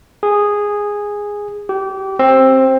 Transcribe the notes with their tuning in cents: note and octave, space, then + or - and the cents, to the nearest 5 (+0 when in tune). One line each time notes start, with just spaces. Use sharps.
G#4 -10
G4 -25
C4 +15